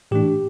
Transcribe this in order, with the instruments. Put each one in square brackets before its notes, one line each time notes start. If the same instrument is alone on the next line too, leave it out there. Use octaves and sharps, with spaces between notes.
[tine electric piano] A2 E3 A3 D4 G4